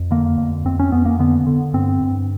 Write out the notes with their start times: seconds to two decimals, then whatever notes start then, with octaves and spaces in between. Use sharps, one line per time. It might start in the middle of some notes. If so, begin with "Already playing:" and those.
Already playing: F2
0.11 D3 A#3
0.38 F2
0.65 F2 C4
0.80 C#4
0.92 F2 B3
1.05 A#3
1.19 D3 B3
1.47 D3
1.74 G2 C4
2.01 G2